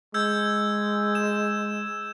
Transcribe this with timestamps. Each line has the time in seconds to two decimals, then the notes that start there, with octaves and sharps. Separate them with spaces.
0.14 G#3 E6 G6 G#6
1.15 E7